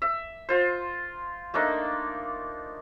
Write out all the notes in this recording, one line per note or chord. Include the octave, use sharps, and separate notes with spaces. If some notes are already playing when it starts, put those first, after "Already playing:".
E5
F4 C5
A3 A#3 D4 D#4